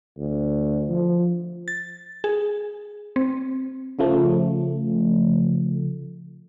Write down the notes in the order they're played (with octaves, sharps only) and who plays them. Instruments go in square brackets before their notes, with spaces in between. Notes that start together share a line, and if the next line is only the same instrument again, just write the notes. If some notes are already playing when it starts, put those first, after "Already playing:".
[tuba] D2
F3
[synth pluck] A6
G#4
C4
[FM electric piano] C#3 F3 A3